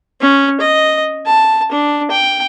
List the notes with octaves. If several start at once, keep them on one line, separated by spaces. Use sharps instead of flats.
C#4
D#5
A5
D4
G5